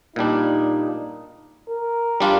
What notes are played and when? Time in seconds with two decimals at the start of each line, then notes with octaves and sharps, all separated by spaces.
0.16 A#2 G3 D4 D#4
1.70 A#4
2.20 G3 D4 F4